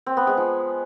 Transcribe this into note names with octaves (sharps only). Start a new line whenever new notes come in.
C4
B3
G#3
F3